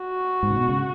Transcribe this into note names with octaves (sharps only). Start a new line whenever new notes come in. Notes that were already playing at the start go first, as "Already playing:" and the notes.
Already playing: F#4
G#2
C#3
B2
C#3